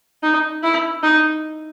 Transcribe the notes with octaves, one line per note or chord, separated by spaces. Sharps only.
D#4
E4
D#4